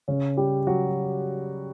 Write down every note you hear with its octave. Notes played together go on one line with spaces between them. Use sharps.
C#3 C#4
G3 G4
F#3 F#4